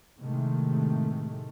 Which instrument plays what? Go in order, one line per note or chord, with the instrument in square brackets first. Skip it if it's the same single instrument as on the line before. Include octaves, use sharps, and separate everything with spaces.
[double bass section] A2 C3 D#3 G#3 A3